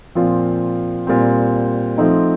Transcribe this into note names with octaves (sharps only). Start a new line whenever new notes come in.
A#2 F3 C4 F4
A#2 G3 C4
F3 A3 C4 D#4